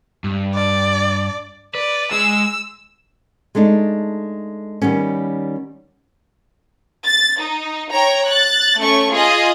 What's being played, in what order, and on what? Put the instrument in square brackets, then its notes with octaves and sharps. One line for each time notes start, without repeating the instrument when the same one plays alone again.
[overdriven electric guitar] G2
[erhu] D5
[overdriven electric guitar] B4 [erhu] D5
[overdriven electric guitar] G#3 G#4 [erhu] E6
[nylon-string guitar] G#3 A3 D4 D#4
D#3 G3 B3 C#4
[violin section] A6
D#4
C#5 G5 A#5
F#6 A6
A3 C#4 C#6
F4 G#4 D#5